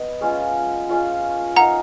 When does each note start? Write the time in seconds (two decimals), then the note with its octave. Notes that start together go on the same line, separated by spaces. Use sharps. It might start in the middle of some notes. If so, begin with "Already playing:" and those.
Already playing: B3 D#5
0.21 G#3 C#4 F4
0.89 G#3 C#4 F4
1.56 D#4 A#4 F5 F#5 A#5